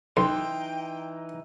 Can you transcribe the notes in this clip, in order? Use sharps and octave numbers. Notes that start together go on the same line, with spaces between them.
B1 E3 D#4 G5 C6